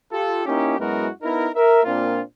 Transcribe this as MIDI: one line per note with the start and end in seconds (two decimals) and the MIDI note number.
0.12 0.44 65
0.12 0.44 67
0.12 0.44 69
0.46 0.78 58
0.46 0.78 61
0.46 0.78 63
0.46 0.78 64
0.46 0.78 67
0.79 1.08 42
0.79 1.08 56
0.79 1.08 59
0.79 1.08 64
0.79 1.08 66
0.79 1.08 70
1.22 1.48 59
1.22 1.48 63
1.22 1.48 64
1.22 1.48 70
1.55 1.83 70
1.55 1.83 76
1.84 2.21 46
1.84 2.21 58
1.84 2.21 60
1.84 2.21 62
1.84 2.21 65